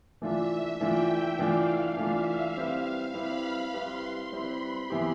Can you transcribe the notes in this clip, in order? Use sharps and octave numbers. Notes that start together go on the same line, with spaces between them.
E3 A3 D4 F4 E5
E3 A3 D4 F4 G5
E3 A3 D4 F4 F5
E3 A3 D4 F4 E5
G3 C4 E4 G4 B4 F5
G3 C4 E4 G4 B4 B5
G3 C4 E4 G4 B4 C6
G3 C4 E4 G4 B4 B5
C3 E3 B3 E4 G4